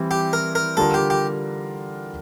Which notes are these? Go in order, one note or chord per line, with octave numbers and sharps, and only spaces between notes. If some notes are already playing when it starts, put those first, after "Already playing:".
Already playing: E3 G3 C4 E4
G4
A#4
A#4
D3 G3 D4 F4 A4 A#4
G4
G4